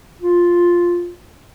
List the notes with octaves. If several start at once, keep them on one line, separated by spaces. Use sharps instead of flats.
F4